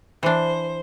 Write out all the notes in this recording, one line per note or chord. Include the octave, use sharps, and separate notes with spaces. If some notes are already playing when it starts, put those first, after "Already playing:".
E3 D4 C5